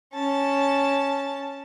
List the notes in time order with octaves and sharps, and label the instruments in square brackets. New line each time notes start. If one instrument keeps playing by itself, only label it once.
[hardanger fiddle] C#4 A5